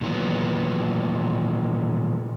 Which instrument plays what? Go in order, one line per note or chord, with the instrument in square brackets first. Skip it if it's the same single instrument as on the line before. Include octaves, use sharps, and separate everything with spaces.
[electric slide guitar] A#2 D#3 E3 F#3 B3